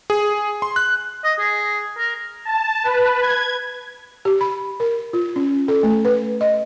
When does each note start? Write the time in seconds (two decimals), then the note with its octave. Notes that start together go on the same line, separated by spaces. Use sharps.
0.10 G#4
0.62 C6
0.76 F#6
1.24 D#5
1.39 G#4
1.98 A#4
2.45 A5
2.84 B4
3.21 G#6
4.25 G4
4.41 B5
4.80 A#4
5.13 F4
5.36 C#4
5.68 A4
5.83 A3
6.05 B4
6.41 D#5